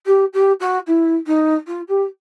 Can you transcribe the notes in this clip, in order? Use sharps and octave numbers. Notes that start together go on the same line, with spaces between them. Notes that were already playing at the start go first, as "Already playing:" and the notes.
G4
G4
F#4
E4
D#4
F4
G4